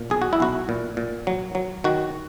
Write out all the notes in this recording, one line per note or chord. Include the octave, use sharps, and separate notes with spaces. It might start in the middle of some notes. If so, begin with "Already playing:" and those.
Already playing: A#2
B1 G#4
F#4
E4
B1 F#4
A#2
A#2
F#3
F#3
D#3 F#4